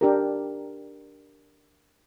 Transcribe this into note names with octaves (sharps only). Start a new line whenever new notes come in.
D4 G4 A#4